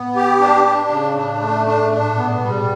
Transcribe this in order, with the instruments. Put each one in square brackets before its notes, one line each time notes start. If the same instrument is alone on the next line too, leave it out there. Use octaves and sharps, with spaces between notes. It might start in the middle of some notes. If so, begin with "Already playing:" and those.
Already playing: [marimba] A2 [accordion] B3
[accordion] G4
D4
D4
C#3
[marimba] A2 [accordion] D4
[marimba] A2
[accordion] A3
[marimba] A2
[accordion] D4
[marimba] G#2
[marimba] A2 [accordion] D4
[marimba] A#2
[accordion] B3
[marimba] B2
[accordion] G3
[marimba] G#2